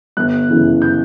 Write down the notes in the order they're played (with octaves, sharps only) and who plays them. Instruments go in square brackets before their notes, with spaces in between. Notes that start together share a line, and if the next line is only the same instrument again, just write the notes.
[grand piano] G1 F#6
F#2 C#3 E3
G6